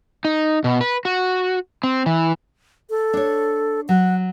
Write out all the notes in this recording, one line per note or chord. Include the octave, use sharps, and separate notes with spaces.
D#4
B2
B4
F#4
C4
E3
A4
D4 C#5
F#3 F#5